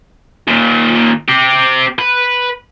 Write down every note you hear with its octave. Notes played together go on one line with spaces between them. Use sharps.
D#2 A#2
C4 G4
B4